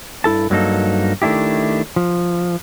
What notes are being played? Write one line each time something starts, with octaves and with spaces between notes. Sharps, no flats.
G2 E4 A4 A5
G2 F#3 A#3 C#4 D#4 A4
D#3 A3 D4 E4 G4
F3